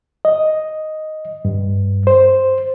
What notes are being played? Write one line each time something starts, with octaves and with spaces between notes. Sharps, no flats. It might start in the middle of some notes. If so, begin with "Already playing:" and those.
D#5
G2
C5